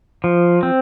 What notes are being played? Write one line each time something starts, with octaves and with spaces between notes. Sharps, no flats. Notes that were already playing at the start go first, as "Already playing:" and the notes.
F3
C4